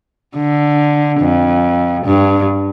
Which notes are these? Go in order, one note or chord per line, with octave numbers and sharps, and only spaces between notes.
D3
F2
G2